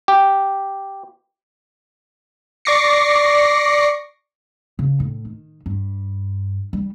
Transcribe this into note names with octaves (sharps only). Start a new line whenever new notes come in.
G4
D5 C#6 D6 A#6 C7 C#7
C#3
A2
D#3
G2
G3